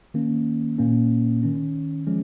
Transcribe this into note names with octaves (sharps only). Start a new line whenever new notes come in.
D#3 A#3 C#4
A#2 A#3 C#4
D#3 C#4
F3 G#3 C#4